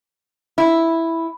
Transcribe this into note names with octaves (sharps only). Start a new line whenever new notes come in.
E4